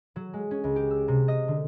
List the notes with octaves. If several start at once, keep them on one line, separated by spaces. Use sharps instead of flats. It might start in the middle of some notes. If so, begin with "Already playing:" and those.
F#3
G#3
C#4
C#2
G4
E6
C3
D#5
D3